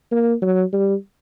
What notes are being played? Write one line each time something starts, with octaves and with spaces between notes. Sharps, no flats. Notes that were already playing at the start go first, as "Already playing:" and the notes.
A#3
F#3
G3